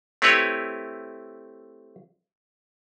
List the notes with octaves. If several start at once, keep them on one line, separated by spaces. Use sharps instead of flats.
A3 C4 E4 G4 B4 C#5